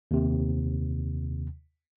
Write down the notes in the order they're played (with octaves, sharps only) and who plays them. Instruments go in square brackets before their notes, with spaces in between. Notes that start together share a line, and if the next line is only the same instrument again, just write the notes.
[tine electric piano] D#2 C3